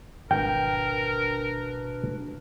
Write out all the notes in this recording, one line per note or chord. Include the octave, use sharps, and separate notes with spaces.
G#1 B2 D4 A#4 B4 G5